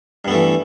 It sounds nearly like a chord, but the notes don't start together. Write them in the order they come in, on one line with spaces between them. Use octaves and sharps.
G2 B3 A3 E3